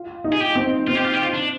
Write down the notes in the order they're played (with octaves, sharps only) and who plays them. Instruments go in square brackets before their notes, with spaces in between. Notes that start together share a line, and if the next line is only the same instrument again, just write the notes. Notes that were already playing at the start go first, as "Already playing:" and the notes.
Already playing: [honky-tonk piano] F4
D#4
[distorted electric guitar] G#4
G4
[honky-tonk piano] C4
[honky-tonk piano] C4 [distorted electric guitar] F4
[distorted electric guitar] G4
F4
G4
F4
D4